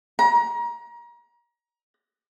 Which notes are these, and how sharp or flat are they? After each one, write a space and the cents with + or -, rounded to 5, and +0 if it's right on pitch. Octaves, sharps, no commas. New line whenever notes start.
A#5 +30